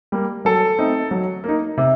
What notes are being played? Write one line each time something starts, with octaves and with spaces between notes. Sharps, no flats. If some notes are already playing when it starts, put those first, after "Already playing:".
G3 A#3
F#3 A4
A3 C4 D#4
F#3
A#3 D#4
C3